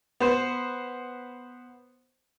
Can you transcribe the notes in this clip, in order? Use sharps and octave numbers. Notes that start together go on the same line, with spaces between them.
B3 C5